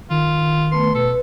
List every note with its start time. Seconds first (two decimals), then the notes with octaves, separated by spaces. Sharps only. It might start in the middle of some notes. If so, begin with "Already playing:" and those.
0.10 D#3 F4
0.72 A3 B3 B4 C6
0.95 B2 A4 B4